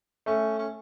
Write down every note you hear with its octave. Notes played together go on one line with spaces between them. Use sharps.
A3 C#4
C#4